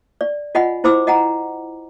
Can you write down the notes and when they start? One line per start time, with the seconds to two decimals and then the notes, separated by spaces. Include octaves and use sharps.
0.21 D5
0.55 F4 D#5 F#5 G#5 B5
0.84 E4 C5 B5 D6 E6
1.07 D#5 F#5 G#5 A#5